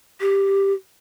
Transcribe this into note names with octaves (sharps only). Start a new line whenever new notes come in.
G4